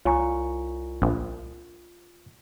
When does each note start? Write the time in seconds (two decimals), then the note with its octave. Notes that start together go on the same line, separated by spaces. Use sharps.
0.05 C2 F4 C#5 G#5 A#5 C#6
1.02 A#1